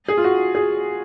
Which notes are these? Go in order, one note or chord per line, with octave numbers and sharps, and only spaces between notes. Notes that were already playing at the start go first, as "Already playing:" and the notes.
G#4
F4
F#4
G#4